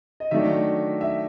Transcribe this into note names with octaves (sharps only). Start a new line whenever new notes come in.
D#5
D#3 F#3 A3 D4 E5
E5